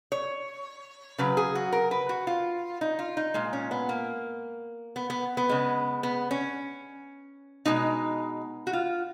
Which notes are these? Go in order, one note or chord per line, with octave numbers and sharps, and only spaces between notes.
C#5
C#3 F#3 B4
G#4
F#4
A#4
B4
F#4
F4
D#4
F4
D#4
A#2 G#3
C#4
B3
A#3
B3
B3
B3
C#3 G#3
B3
C#4
B2 G#3 D#4
F#4
F4